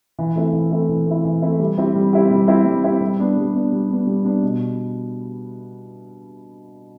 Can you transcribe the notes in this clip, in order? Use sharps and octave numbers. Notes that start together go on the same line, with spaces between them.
E3
A3 C4 E4
E3
A3 C4 E4
E3
A3 C4 E4
E3
A3 C4 E4
G3
C4 E4 G4
G3
C4 E4 G4
G3
C4 E4 G4
G3
C4 E4 G4
G3
B3 D4
G3
B3 D4
G3
B3 D4
G3
B3 D4
B2